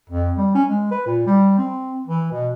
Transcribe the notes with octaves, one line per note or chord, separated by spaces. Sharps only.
F2
G3
C#4
G#3
B4
A#2
G3
C4
E3
B2